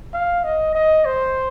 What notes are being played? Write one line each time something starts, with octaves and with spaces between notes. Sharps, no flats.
F5
D#5
D#5
C5